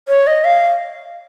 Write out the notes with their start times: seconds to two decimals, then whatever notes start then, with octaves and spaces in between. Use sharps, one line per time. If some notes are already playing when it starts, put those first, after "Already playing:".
0.08 C#5
0.27 D#5
0.45 F5